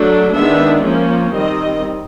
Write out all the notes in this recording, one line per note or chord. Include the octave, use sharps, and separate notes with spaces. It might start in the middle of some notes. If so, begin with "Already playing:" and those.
Already playing: F#3 A3 D4
D#3 G#3 B3 D4 E5
F3 A#3 C#4
D#3 G3 C4 D#5